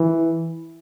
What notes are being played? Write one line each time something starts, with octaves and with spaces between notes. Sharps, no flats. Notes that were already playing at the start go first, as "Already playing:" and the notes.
Already playing: E3